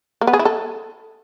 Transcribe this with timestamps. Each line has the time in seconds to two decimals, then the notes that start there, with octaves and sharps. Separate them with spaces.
0.21 A#3
0.27 B3
0.33 G#4
0.39 E4
0.45 A4